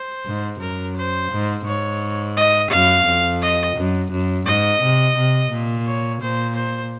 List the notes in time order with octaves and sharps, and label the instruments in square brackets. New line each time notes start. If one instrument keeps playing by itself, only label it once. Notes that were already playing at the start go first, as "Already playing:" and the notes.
Already playing: [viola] C5
[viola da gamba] G#2
[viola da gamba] F#2 [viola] A#4
[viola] C5
[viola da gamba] G#2
[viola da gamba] G#2 [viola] C#5
[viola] D#5
[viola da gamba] F#2 [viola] F5
[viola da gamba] F2
[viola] D#5
[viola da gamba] F#2
F#2
[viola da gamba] G#2 [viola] D#5
[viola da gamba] C3
C3
A#2
[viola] C#5
[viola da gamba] A#2 [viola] C5
[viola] C5